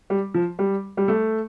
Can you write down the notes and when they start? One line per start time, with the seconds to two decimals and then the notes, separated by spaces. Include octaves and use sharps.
0.10 G3
0.34 F3
0.59 G3
0.97 G3
1.08 A3